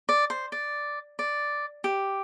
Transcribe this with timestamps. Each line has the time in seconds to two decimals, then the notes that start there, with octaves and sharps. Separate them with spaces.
0.09 D5
0.30 C5
0.52 D5
1.19 D5
1.84 G4